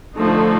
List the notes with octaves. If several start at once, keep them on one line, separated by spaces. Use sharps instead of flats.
D3 F3 A3 D#4